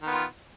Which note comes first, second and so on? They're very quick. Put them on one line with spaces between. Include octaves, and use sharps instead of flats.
D#3 B3 F4